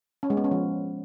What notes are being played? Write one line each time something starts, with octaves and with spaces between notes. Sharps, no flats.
C#4
G#3
B3
C#4
F3